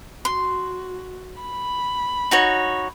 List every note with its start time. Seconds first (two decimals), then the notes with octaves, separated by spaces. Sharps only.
0.25 F#4 C6
1.41 B5
2.31 D#4 F#4 C#5